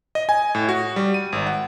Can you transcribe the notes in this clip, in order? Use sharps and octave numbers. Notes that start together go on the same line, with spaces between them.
D#5
G#5
A2
F#4
G3
D#7
G#1
F#5